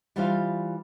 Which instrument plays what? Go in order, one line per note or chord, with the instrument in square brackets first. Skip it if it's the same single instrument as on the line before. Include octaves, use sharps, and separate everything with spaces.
[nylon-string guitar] E3 G3 F4 C5 F5